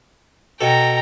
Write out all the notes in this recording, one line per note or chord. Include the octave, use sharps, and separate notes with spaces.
B2 A4 G5 A#5